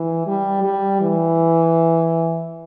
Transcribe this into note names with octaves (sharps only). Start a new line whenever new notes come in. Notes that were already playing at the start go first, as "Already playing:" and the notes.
Already playing: E3
G3
G3
E3